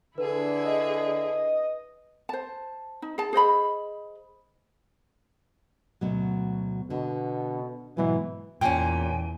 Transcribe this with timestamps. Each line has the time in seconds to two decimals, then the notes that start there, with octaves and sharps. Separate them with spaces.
0.18 D3 E4 G#4 B4
0.65 D#5
2.29 C5 A5
3.02 D#4
3.18 G#4 A5
3.33 G#4 C5 D#5 B5
6.01 D2 B2 F#3
6.90 B2 D3
7.97 G#2 B2 E3 F#3
8.61 E2 A#2 C#4 G5 G#5